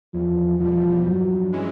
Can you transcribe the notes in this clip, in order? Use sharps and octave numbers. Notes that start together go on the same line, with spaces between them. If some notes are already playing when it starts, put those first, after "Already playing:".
E2 F3
B2 F3 G3
G2 F#3
E3 G#3 C#4 E4